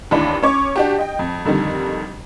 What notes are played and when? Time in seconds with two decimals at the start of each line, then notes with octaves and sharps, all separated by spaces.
0.11 A1 D#2 E3 D4 B5
0.42 C#4 C#5 D6
0.76 D4 F#4 G4
0.98 D#5 G5
1.19 F2
1.45 F2 D3 D#3 G3